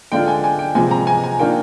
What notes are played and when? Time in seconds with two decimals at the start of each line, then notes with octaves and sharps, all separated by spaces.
0.12 D3 G#3 D4 F4 G5
0.28 G#5
0.44 G#5
0.59 G5
0.75 C3 F3 G#3 G#5
0.91 A#5
1.07 G#5
1.24 G#5
1.39 D#3 A#3 D4 F4 G5